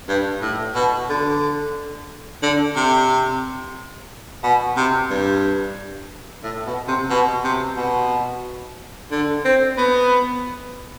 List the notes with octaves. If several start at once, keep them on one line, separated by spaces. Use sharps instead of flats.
G2
A2
B2
D3
D3
C3
B2
C3
G2
A2
B2
C3
B2
C3
B2
D3
C4
B3